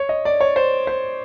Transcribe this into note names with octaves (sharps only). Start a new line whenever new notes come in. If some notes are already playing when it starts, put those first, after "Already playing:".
Already playing: C#5
D#5
D5
C#5
C5
C5